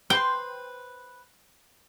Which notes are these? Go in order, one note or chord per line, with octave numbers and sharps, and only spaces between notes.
B4 C5 G5 C6